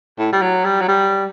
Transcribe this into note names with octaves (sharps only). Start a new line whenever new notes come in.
A2
G3
F#3
G3
F#3
G3